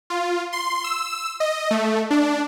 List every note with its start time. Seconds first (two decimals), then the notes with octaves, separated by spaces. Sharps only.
0.10 F4
0.53 C6
0.84 E6
1.40 D#5
1.71 A3
2.10 D4